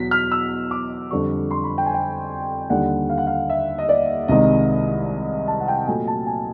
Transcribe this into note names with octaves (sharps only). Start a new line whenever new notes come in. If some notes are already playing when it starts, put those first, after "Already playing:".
Already playing: E2 B2 F#3 B6
F6
E6
D6
F2 D3 G3 C#6
C6
B5
G5
G#5
G5
D#2 D3 G3 F#5
F5
F#5
F5
E5
D#5
D5
C2 C3 D#3 G#3 D#5
A5
F#5
G5
A#2 F#3 A3 G#5
A5
G#5